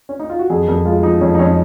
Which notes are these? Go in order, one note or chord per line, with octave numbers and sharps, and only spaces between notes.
C#4
D#4
F4
F#4
F2 G#4
F2 A#4
G#3 F4
F3 D#4
F2 C#4
D#4
F2 C#4